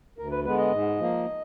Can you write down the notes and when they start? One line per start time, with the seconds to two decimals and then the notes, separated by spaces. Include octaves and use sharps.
0.18 D2 A#4
0.31 B4
0.45 D3 G#3 B3 B4
0.58 D#5
0.72 G#2
0.99 F3 A#3